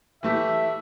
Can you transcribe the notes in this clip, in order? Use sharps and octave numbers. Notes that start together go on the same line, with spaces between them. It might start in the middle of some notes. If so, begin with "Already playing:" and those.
E3 A3 G4 E5